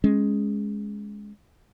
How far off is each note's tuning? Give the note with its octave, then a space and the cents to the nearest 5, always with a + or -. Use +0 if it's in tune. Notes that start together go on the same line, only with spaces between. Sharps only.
G#3 +0 C#4 +0